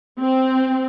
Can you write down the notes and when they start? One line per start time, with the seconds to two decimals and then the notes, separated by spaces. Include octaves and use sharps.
0.20 C4